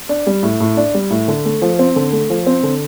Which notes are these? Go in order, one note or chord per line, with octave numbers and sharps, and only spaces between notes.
D4
G3
A2
A2
D4
G3
A2
D3
A3
F3
C4
D3
A3
F3
C4
D3